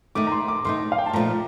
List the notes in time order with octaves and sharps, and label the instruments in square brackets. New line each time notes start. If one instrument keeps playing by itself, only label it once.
[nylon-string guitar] D#3 A3 D#4 [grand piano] D6
[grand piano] A#5
C6
D6
[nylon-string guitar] D#3 A3 D#4 [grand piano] C6
[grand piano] F5
G5
A5
[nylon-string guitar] A#2 F3 A3 D#4 [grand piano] A#5